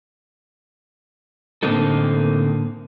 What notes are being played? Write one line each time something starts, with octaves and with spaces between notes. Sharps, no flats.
A2 D3 A#3 C4 D#4 A4